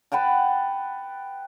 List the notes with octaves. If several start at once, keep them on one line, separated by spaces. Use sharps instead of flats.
B4 F#5 G5 A5